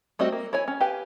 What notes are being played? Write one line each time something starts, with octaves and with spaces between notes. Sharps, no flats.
G3 A3 C4 F#4 D#5
A#3
E4 C#5 G#5
C#4
G4 B4 F5 G#5